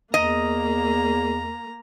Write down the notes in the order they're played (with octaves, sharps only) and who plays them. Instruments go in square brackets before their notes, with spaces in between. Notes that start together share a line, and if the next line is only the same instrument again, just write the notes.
[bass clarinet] E2 [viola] A#3 [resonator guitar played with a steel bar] D#5 [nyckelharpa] A#5